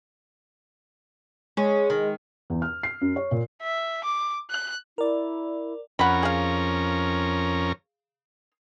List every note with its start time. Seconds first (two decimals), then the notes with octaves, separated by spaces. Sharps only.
1.57 G#3 C#4
1.90 D#3
2.50 E2
2.62 F6
2.83 C7
3.01 F#2
3.16 C#5
3.31 A#2
3.62 E5
4.04 D6
4.50 F#6
4.98 E4 A#4 D5
5.99 F2 C#4 A#4 F#5 B5
6.23 G#4 F5